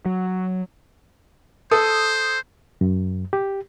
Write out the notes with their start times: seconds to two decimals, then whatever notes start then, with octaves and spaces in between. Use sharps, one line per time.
0.06 F#3
1.71 A4 C5 D#6
2.81 F#2
3.33 G4